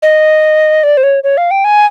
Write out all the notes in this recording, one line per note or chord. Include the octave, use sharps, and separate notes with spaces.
D#5
D5
C5
C#5
C#5
F5
G5
G#5